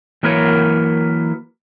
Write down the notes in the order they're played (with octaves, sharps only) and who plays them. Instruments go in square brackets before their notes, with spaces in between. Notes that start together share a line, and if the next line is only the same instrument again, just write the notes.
[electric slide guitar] E3 F#3 A#3 A#4 B4 C#5